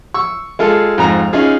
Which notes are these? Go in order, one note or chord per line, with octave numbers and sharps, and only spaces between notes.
C#6 E6
G#3 F4 G#4 A4
F2 G#2 A#5
C#4 D#4 F4 G#4